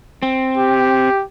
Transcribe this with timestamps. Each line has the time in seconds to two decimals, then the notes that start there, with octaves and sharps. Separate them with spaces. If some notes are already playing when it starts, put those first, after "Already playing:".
0.23 C4
0.58 G4